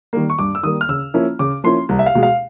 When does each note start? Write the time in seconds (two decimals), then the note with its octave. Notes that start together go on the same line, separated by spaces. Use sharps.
0.13 D#3 G3 A#3
0.30 C#6
0.39 G2 D6
0.55 E6
0.63 D#3 G3 A#3 D#6
0.81 F6
0.89 C#3 E6
1.14 F3 A#3 C#4 E4
1.39 C#3 D6
1.64 F3 A#3 C#4 E4 C6
1.89 C2
1.99 E5
2.06 F5
2.15 B2 G#3
2.23 F5